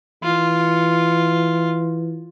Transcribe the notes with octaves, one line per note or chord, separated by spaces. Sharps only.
E3 F4